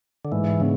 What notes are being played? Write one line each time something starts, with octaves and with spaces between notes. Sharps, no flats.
D3
G#2 E3
C#3 B3 D4